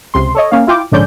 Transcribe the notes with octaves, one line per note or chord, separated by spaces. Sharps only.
C#2 C3 C6
A4 C#5 D#5
A#3 C#4 F5
E4 F4 G5 D6
A#1 G#2 D3 C#4 D5 G6